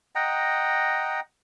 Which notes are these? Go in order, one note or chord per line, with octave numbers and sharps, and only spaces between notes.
D#5 F#5 G5 A#5